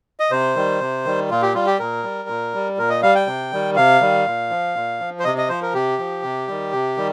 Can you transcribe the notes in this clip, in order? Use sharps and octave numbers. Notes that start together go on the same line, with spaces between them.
D#5
C3 C5
D#3 G3
C3
D#3 G3
A#2 F4
G4
G3 F4
G4
A#2 A#4
G3
A#2
G3
A#2 A#4
D#5
G3 F5
G5
C3
D#3 G3
C3 F5
D#3 G3
A#2
F3
A#2
F3
C5
C3 D#5
D#5
F3 C5
A#4
C3 G4
F3
C3
D#3 G3
C3
D#3 G3